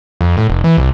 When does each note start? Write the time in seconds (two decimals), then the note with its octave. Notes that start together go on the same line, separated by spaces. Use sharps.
0.21 F2
0.37 A2
0.50 F1
0.64 E3
0.77 C2